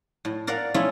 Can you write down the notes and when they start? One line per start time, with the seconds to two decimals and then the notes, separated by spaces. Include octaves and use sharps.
0.25 A2
0.47 A#4 D5 F5 F#5
0.74 A3 C#4 E4 F4 G#4